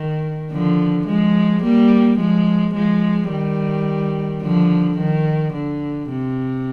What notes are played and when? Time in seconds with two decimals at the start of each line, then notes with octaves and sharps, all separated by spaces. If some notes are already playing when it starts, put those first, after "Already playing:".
Already playing: D#3
0.52 D3 F3
1.07 F3 G#3
1.63 G3 A#3
2.20 F3 G#3
2.75 F3 G#3
3.31 D#3 G3
4.42 D3 F3
4.98 D#3
5.54 D3
6.09 C3